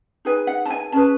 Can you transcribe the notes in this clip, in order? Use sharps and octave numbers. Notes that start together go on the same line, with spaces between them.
D#4 G#4 B4 G#5
F#5
A5
G#5
C#4 G#4 B4 A5